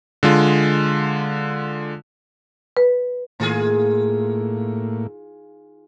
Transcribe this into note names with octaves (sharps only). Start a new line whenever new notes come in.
D3 G#3 F4
B4
A2 D#3 A#3 F4 G#4